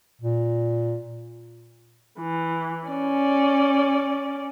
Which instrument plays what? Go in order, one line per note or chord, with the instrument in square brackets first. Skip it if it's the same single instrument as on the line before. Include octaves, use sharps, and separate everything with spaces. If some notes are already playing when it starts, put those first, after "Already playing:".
[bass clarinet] A#2
[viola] E3
C#4 D5